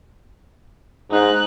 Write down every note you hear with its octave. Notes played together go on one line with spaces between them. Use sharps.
G#2 D#4 F#6